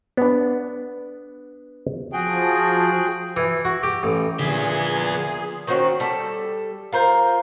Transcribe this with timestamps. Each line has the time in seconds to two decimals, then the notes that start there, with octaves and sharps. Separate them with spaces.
0.17 B3 D4
2.13 F3 F#4 G#4 G5
3.37 E3
3.65 F#4
3.83 G4
4.03 A1
4.39 A#2 D3 F3 B3 G#4 E5
5.67 D#3 C4 C#4 F#4
6.00 G3 A4
6.92 F4 A#4 C5